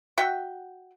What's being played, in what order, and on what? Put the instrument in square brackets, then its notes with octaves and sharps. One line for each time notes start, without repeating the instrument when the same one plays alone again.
[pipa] F#4 E5 F#5 G5